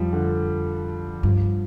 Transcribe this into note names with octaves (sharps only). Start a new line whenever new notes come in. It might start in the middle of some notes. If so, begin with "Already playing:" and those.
Already playing: F2 F3 G3
D3
G2 F3